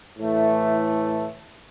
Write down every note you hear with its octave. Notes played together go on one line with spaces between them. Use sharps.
A2 E3 A3